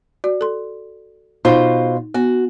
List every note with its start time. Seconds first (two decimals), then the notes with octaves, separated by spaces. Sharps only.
0.24 F#4 D5
0.41 A4 C6
1.45 B2 D#4 F4 C5
2.14 B3 F#4